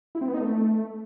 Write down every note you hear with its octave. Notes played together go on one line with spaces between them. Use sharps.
E4
C4
B3
D#4
A3